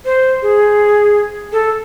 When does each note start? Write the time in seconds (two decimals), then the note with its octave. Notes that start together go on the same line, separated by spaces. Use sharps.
0.05 C5
0.42 G#4
1.52 A4